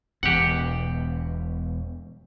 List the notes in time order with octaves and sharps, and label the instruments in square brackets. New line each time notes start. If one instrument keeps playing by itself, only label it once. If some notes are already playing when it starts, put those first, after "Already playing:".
[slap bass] E1 B2 [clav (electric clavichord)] G4 F#5